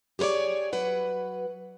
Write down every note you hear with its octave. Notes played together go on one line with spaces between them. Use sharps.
G4 G#4 B4 C#5 D5
F#3 B4 F#5